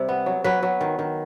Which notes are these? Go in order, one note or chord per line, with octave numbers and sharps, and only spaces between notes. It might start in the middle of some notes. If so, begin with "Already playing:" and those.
Already playing: C3 G3
B3
F#3
F#3 B4
F#3
D#3
D#3